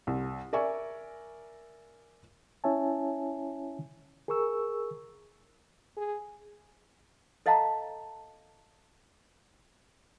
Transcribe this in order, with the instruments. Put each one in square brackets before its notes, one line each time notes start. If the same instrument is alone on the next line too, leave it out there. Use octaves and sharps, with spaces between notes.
[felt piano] C2
A#4 D5 E5 G#5 C#6
[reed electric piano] C#4 E4 C#5 E5 G#5 A5
G#4 A#4 C#6 E6
[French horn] G#4
[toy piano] A4 D#5 F5 F#5 A5 A#5